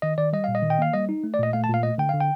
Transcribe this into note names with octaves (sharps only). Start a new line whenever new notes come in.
D#3 D#5
D#3 D5
G3 D#5
A#2 F5
D#5
D#3
G5
A#3 F5
G3 D#5
D#4
A3
D5
A#2 D#5
A3 F5
A5
A#2 F5
A3 D#5
D3 G5
D3 F5
G5